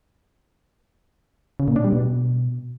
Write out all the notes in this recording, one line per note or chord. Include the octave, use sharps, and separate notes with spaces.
C#3
A#2
D4
G3
B2